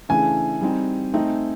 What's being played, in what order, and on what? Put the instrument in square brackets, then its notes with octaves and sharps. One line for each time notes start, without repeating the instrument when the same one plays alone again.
[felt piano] C#3 E3 A3 D4 [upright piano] G#5
[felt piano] G3 C4 D#4
A3 C4 D#4